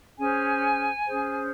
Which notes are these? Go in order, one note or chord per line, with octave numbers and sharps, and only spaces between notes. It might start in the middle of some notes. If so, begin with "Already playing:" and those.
C#4 G#4 C5 G#5
C#4 G#4 C5